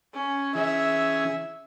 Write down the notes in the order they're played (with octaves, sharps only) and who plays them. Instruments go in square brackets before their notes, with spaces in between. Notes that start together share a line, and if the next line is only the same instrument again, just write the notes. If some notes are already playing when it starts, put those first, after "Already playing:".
[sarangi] C#4
[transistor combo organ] E3 C#4 G#4 [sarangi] E5